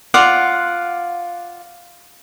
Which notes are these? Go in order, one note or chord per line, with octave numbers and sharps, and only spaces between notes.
F4 D5 F5 F#5